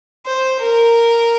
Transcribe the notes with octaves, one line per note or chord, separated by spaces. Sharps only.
C5
A#4